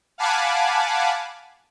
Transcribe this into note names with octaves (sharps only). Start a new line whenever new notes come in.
F5 F#5 G#5 A5 B5 D6